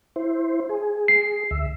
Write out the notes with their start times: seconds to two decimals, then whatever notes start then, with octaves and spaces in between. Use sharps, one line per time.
0.16 E4 C5
0.69 G#4
1.08 C7
1.51 D2 E5